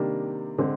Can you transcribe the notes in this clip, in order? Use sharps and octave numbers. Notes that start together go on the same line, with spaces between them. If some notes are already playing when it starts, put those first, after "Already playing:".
Already playing: C3 D#3 G3 A#3 D4
D3 G#3 C4